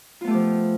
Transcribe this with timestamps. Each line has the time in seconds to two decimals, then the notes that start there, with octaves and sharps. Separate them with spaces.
0.21 F4
0.24 B3
0.27 A3
0.30 G4
0.34 F3